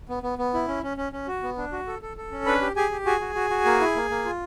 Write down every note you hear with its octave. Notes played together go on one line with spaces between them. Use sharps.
B3
B3
B3
E4
C#4
C#4
C#4
C#4
F#4
B3
D4
F#4
A4
A4
A4
C#4
D4 B4 B5
G4
G4 G#4 G#5
G4
F#4 G#4 G#5
F#4
F#4
F#4
A#3
E4
A#3
A#3
F4